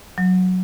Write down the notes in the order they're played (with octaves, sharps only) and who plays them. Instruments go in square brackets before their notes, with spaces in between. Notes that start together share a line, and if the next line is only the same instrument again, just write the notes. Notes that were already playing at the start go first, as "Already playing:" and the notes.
[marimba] F#3